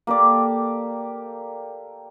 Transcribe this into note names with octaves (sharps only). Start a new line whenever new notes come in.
A#3 G4 A4 D5